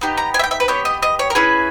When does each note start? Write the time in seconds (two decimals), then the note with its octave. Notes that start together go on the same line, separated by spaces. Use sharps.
0.01 B3 D#4 G4
0.17 A#5
0.34 G#5
0.39 E5
0.44 G5
0.51 E5
0.60 B4
0.68 B3 G4 C#5
0.85 D#5
1.02 D#5
1.19 C#5
1.30 A#4
1.35 C#4 E4 G#4 B4